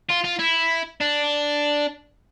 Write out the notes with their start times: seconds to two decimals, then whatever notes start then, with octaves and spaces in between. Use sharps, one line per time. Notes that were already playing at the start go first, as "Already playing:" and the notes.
0.10 F4
0.25 F4
0.39 E4
1.01 D4